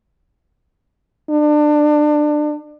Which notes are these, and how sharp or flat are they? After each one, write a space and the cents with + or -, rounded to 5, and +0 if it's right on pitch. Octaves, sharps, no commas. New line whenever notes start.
D4 +25